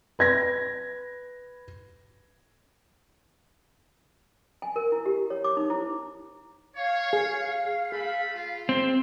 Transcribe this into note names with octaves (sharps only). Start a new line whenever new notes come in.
B4 G#6 A#6
G#5
A#4
E4
G4
C#5
D6
D#4
E4
C#5 F5
G#4
A3 G#4 B5
F4
C4